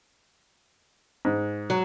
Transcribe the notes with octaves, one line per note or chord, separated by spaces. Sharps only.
G#2
F#3